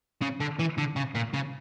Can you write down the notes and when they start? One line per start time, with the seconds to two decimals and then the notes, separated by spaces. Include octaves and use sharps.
0.22 C#3
0.40 D3
0.59 E3
0.78 D3
0.96 C#3
1.15 A#2
1.34 C#3